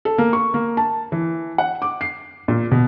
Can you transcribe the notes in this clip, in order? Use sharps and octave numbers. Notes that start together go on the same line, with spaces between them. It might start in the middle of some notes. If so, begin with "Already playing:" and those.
A4
A#3
C#6
A#3
A5
E3
F#5
D6
C7
A#2
B2